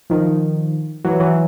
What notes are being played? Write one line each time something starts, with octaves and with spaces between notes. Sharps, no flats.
D#3 F3
E3 F#3
E3 F#3